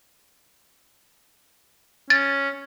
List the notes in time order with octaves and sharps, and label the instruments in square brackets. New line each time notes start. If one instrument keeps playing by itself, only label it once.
[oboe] C#4 [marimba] A6